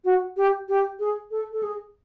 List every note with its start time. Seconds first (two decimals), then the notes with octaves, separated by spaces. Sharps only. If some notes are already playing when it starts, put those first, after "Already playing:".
0.05 F#4
0.37 G4
0.69 G4
1.00 G#4
1.31 A4
1.52 A4
1.63 G#4